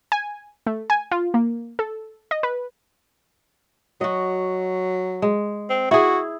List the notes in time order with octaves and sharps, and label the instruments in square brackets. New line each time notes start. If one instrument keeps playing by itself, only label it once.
[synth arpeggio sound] G#5
A3
G#5
F4
A#3
A4
D#5
B4
[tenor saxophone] F#3 [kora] F#4 D#5
[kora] G#3
[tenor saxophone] C4
[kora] E4 G#4 [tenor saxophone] F#4